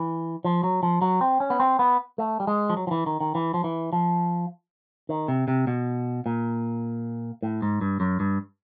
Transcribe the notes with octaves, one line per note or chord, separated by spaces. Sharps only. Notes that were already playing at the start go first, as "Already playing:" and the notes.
Already playing: E3
F3
F#3
F3
F#3
C4
C#4
B3
C4
B3
A3
G3
G#3
F3
F#3
F3
E3
D#3
D#3
E3
F3
E3
F3
D#3
C3
C3
B2
A#2
A2
G#2
G2
F#2
G2